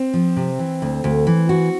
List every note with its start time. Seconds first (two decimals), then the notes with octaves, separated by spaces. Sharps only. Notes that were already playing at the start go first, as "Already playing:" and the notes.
Already playing: C4
0.14 F3
0.36 C3
0.59 E3
0.82 D2
1.04 D2
1.27 E3
1.49 F#4